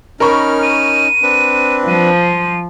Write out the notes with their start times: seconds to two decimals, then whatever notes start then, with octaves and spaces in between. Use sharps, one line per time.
0.20 C#4 D#4 A#4 B5 C#6 F6
0.63 D#7
1.22 C4 D4 B4
1.88 F3 D#7